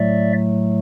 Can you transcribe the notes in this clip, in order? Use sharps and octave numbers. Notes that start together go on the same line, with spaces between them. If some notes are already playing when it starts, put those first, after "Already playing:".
Already playing: A2 F#3 A3 D5 E5